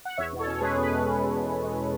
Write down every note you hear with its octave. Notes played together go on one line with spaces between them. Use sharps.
F#5
E2 C#5 E5
B2
A4 C#5
C#4
C#5
G#3 G#4 B4
E2
G#4 B4
E2
C#4
G#3
E2
E2
G#3